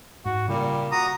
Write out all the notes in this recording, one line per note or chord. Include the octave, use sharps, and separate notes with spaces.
G#2 F#4
A#2 C#3 G3
F#4 A#5 D#6